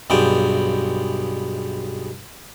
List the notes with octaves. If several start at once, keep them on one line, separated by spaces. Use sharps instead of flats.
B1 G2 G#3 B3 G5